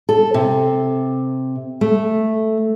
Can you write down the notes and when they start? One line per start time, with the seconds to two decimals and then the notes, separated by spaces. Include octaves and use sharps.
0.09 A4
0.34 C3
1.81 A3